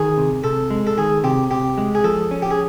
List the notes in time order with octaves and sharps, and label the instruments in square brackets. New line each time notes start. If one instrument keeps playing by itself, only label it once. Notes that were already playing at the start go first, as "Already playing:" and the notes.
Already playing: [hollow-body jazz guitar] D#3 [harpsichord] G#4
[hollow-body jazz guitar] C3
[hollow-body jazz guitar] C3 [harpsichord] A4
[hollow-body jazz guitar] G#3
[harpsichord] A4
[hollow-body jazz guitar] D#3 [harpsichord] G#4
[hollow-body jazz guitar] C3 [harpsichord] G4
[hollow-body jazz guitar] C3 [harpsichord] G4
[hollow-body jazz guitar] G#3
[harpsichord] G#4
[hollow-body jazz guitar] F3 [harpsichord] A4
[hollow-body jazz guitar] C#4
[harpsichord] G4
G#4